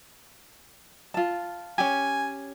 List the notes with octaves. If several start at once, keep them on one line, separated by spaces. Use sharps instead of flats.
F4 A5
C#4 G4 G#5